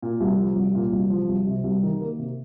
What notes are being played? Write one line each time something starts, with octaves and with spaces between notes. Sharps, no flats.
A#2
C2
F3
C2
A#2
C2
F3
C2
C3
C2
D#3
A#3
C3